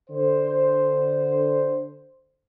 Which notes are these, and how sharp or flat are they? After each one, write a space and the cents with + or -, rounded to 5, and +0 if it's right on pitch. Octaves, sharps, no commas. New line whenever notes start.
D3 +0 C5 +0